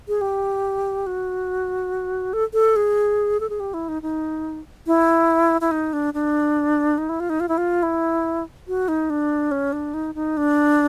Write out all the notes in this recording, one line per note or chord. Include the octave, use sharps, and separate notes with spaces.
G#4
G4
F#4
A4
A4
G#4
A4
G#4
G4
E4
D#4
D#4
E4
E4
D#4
D4
D4
D#4
E4
F4
D#4
F4
E4
F4
E4
F#4
D#4
D4
C#4
D4
D#4
D#4
D4